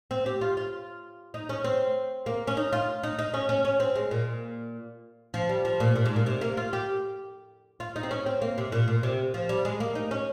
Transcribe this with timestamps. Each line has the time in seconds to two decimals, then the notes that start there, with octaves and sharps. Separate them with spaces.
0.11 C4
0.26 G4
0.41 F4
0.57 F4
1.34 D#4
1.49 C#4
1.64 C4
2.26 A#3
2.47 C#4
2.57 D#4
2.73 F4
3.03 D#4
3.19 D#4
3.34 C#4
3.49 C#4
3.65 C#4
3.80 C4
3.96 G#3
4.11 A#2
5.34 F3
5.49 G3
5.65 F3
5.80 A#2
5.95 A#2
6.06 G#2
6.16 A#2
6.26 C3
6.41 A#3
6.57 F4
6.73 G4
7.80 F4
7.96 D#4
8.03 C4
8.11 C#4
8.26 C4
8.42 A#3
8.58 C3
8.72 A#2
8.88 A#2
9.03 C3
9.34 F3
9.49 G3
9.65 G#3
9.80 A#3
9.95 D#4
10.11 C#4